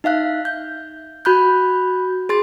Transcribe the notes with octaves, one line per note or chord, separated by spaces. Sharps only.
D#4 E5 F5 F#6
G6
F#4 B5 F#6 G6
G#4 C6 A6